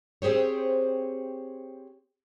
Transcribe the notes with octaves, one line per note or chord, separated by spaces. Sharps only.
C4 G4 G#4 C5 C#5